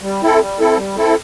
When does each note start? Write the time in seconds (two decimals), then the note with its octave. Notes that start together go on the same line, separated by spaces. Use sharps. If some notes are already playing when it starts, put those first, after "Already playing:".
0.02 G3
0.22 C4 E4 A4
0.40 G3
0.59 C4 E4 A4
0.77 G3
0.96 C4 E4 A4